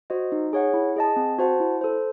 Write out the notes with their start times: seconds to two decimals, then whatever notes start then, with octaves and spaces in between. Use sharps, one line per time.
0.10 F#4 C5 D#5
0.32 D#4
0.53 G#4 C#5 F#5
0.74 E4
0.96 G#4 D#5 A5
1.16 C4
1.39 F#4 C5 F#5 A5
1.60 E4
1.81 A4 C5